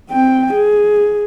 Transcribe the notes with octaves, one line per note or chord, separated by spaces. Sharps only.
C4 G5
G#4